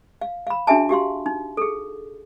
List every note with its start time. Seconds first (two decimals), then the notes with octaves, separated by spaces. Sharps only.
0.21 F5
0.47 F5 B5
0.67 D4 F#4 G#4 E5 G#5 A5
0.89 F#4 G4 F5 C6
1.26 D#4
1.57 G#4 A4